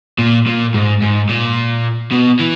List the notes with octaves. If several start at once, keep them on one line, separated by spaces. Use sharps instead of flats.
A#2
A#2
G#2
G#2
A#2
B2
E3